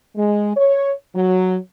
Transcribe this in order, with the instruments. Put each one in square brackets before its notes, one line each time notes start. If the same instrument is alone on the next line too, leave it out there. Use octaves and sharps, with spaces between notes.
[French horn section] G#3
C#5
F#3